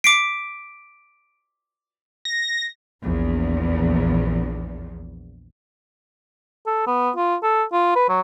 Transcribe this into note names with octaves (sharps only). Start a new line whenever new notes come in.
D6 B6 C7 D7
A#6
A#1 E2
A4
B3
F4
A4
F4
B4
F#3